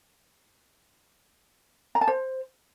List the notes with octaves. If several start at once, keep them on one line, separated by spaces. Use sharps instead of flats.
A#5
A5
C5